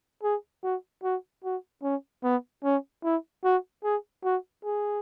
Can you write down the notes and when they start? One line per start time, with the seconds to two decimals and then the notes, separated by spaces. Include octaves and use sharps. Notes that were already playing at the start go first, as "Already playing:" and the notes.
0.23 G#4
0.63 F#4
1.04 F#4
1.44 F#4
1.83 C#4
2.24 B3
2.64 C#4
3.04 E4
3.44 F#4
3.84 G#4
4.24 F#4
4.65 G#4